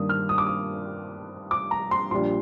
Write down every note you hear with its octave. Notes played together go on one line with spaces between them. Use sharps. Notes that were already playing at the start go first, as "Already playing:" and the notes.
Already playing: G2 D#3 A#3 D4 D#6
F6
D#6
D6
D#6
D6
A#5
C6
A#1 A#2 G3 D4 C6